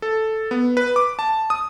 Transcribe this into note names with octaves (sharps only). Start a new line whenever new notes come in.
A4
B3
B4
D6
A5
D#6